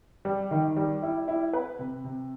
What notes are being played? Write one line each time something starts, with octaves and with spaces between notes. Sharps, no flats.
G3
D#3
G3
E4
E4
B4
C3
C3